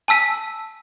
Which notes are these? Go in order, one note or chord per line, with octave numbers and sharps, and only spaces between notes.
G#5 A5 E6 B6 D#7